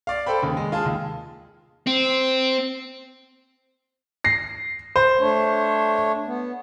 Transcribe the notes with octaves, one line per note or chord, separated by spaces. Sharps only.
D5 F5
A4 C5 G5 B5
D#2 C#3
G#3
F4 G#4 A5
D#2
C4
A#6 C7
C5
A3 D4 C#5
B3